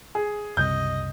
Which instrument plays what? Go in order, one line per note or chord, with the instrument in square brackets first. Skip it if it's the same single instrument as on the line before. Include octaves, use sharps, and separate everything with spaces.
[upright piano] G#4
[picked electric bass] F#1 C2 C3 [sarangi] D#5 [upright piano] G6